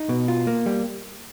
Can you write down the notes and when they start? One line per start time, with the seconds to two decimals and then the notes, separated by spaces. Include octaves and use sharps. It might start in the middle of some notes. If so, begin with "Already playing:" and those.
Already playing: D#4
0.09 B2
0.28 F4
0.47 A#3
0.66 G3